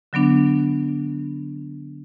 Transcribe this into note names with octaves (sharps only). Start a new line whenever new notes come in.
D3 F#3 B3 D4